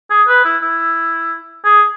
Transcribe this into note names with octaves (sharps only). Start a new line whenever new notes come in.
G#4
B4
E4
E4
G#4